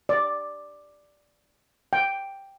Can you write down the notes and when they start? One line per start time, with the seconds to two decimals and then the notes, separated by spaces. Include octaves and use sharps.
0.09 D5
1.93 G5